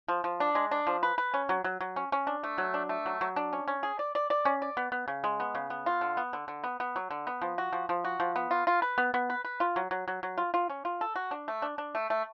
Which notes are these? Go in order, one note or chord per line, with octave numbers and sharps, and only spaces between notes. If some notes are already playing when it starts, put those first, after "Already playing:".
F3
F3
D4
G#3
D4
F3
B4
B4
C#4
F#3
F#3
F#3
C#4
C#4
D4
A3
F#3
D4
A3
F#3
F#3
D4
C#4
C#4
G#4
D5
D5
D5
C#4
D5
B3
B3
C#3
G#3
B3
C#3
B3
F4
D3
B3
D3
D3
B3
B3
F#3
D3
B3
F3
F#4
F3
F3
F#4
F3
B3
F4
F4
B4
B3
B3
B4
B4
F4
F#3
F#3
F#3
F#3
F4
F4
C#4
F4
A4
F#4
D4
A3
D4
D4
A3
A3